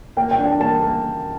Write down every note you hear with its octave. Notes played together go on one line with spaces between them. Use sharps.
A#3 G5
G5
D4
A5
A#3 A5
A#3